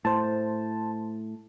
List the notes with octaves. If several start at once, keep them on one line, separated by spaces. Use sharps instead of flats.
A2 C5 A5